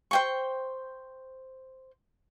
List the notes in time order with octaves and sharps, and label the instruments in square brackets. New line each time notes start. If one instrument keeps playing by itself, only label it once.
[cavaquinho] C5 G5 C#6